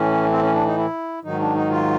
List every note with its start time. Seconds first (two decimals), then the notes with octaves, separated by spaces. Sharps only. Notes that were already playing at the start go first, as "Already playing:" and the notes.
Already playing: A2 E3 C#4
0.30 C4
0.42 C#4
0.54 D4
0.65 D#4
0.77 E4
1.23 G#2 D#3 F#3 D#4
1.39 D4
1.55 D#4
1.70 F4